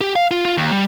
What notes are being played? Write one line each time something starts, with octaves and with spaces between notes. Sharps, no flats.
G4
F5
F4
F4
D#2
G3